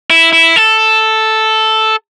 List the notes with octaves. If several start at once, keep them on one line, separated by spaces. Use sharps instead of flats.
E4
E4
A4